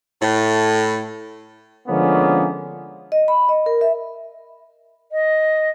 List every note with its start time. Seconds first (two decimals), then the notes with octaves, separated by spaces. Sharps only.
0.22 A2
1.88 D3 F3 G#3 A#3 B3 C#4
3.12 D#5
3.28 B5
3.49 D#5
3.66 A#4
3.81 E5
5.12 D#5